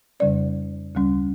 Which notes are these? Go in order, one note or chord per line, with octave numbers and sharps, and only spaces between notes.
F2 C#3 G3 C#4 D5
D2 C#3 G3 C#4